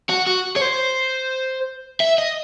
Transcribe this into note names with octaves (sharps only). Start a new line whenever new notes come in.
F#4
F#4
C#5
C5
E5
D#5